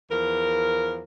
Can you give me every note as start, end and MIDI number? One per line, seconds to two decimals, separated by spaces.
0.10 1.02 40
0.10 1.02 53
0.10 1.02 70